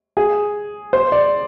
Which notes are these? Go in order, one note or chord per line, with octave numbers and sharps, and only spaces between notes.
G#4
C5
D5